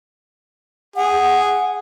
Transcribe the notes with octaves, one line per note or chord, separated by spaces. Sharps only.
G#4 F#5